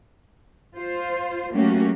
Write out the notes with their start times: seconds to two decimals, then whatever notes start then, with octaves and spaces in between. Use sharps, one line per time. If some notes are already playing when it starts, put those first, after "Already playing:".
0.75 F4 C5
1.52 F#3 A3 A#3 C#4 F#4 G4